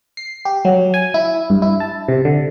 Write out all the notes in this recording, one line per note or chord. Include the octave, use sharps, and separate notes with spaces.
C7
G4
F#3
G#5
E4
G2
E4
A5
C3
D3